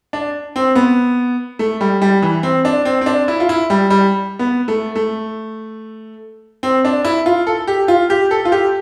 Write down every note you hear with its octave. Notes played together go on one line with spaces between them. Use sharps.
D4
C4
B3
A3
G3
G3
E3
C4
D4
C4
C4
D4
E4
F4
E4
G3
G3
B3
A3
A3
C4
D4
E4
F4
A4
G4
F4
G4
A4
F4
G4